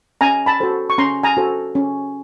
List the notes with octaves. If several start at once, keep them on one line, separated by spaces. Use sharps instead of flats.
C#4 G#5 A#5
A5 B5
F#4 A4 C5
C#6
C#4 A#5 C6
G#5 A#5
F#4 A4 C5
C#4